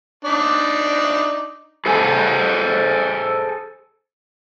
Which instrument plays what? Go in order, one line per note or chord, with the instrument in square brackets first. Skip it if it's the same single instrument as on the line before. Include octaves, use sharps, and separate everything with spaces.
[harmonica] D4 D#4 D5
[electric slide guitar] G#4 A4 C5 G#5